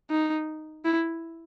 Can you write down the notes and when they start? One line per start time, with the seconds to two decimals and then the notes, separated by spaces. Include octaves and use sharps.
0.10 D#4
0.85 E4